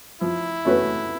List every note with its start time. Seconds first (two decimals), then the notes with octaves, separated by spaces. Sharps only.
0.21 F3 E4
0.65 A3 C#4 F#4 B4